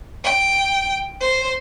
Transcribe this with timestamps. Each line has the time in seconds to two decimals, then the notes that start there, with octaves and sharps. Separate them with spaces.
0.24 G5
1.21 C5